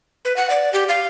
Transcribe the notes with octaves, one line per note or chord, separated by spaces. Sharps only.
B4
F#5
D5
G4
F5